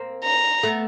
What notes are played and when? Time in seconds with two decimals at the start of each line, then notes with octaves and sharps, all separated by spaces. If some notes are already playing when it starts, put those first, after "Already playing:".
Already playing: A#3 C4
0.24 A#5
0.63 A3 B3